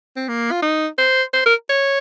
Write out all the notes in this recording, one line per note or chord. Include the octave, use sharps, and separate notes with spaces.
C4
A#3
F4
D#4
C5
C5
A#4
C#5